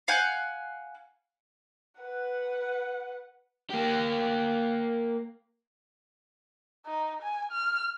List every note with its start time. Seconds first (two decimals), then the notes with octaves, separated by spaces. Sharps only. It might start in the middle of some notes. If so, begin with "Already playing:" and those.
0.08 F5 F#5 G#5 G6
2.00 B4 F#5
3.70 A#3 G4
6.86 D#4
7.23 G#5
7.51 F6